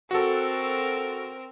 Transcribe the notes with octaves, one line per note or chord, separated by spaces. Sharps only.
C4 F#4 A4 A#4